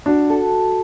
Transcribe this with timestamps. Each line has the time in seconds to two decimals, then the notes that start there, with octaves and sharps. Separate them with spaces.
0.06 D4 F#4
0.30 A4